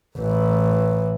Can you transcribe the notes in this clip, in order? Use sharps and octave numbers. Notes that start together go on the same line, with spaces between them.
A1 E3